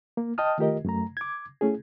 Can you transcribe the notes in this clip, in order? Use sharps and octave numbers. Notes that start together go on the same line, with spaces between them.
A#3
D#5 G5 A5 D#6 F6
D#3 A3 F4 G4 A#4 D#5
F#2 A3 A#5
D6 G#6
A3 C#4 E4 G#4